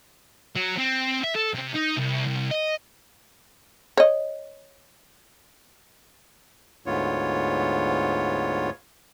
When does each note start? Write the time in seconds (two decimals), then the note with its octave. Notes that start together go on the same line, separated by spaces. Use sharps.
0.56 F#3
0.78 C4
1.24 E5
1.35 A4
1.54 C3
1.74 D#4
1.97 C2
2.26 C2
2.51 D#5
3.97 C#5 D#5
6.86 D2 G#2 B3 F4 C#5